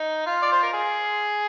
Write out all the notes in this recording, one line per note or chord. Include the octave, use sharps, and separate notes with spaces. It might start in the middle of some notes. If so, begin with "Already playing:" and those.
Already playing: D#4
F4
D5
C5
A#4
G#4